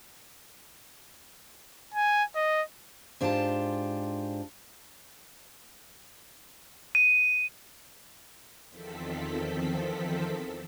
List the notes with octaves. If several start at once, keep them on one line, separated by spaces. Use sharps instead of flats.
G#5
D#5
G#2 D4 F4 G4 G#4 A5
D#7
E2 D#3 F3 C4 A4 B6